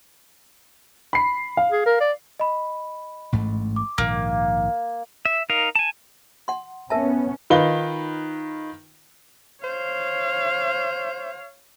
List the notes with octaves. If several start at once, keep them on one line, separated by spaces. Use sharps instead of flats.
B5 C7
F5
G#4
A#4
D5
D#5 B5
A1 G#2 A3
D6
A#1 G#2 D#3 A#3
E5
D#4 A#4 F5
G#5 A5
F#5 C6
B3 C#4 A#4 E5 A5
D#3 D#4 F4 B4 G7
C5 C#5 F5